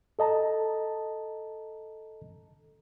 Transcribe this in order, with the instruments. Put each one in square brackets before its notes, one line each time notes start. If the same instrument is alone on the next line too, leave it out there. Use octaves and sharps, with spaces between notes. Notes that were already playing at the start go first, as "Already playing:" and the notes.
[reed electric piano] A4 D#5 A5 A#5